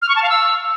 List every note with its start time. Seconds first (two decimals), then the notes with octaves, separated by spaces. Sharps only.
0.02 F6
0.09 C#6
0.16 A5
0.23 F5
0.29 E6